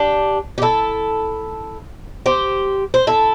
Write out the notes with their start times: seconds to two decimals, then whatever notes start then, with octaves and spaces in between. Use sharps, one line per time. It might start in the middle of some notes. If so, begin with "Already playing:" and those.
Already playing: D4 G4
0.58 G4
0.62 E4 A4
2.26 G4 C5
2.94 C5
3.07 E4 A4